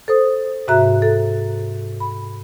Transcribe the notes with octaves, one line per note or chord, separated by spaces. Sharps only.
A4 C5 D#6
G#2 C3 F#4 E5 A#5 F#6
A4
B5